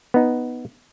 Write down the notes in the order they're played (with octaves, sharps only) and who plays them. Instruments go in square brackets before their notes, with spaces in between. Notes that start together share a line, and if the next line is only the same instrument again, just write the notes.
[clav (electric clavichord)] B3 D#4